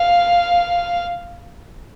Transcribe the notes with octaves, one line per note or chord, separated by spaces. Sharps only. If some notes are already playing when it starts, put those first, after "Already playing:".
Already playing: F5